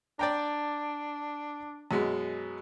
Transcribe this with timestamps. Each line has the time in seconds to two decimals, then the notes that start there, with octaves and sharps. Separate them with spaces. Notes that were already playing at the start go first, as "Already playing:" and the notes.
0.19 D4 D5 G5 A#5
1.91 F#2 B2 G#3